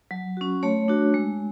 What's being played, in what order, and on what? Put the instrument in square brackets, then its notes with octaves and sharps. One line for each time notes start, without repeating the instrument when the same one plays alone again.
[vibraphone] F#3
C#4 F#4
A3 C#5
D4 F#4
G#3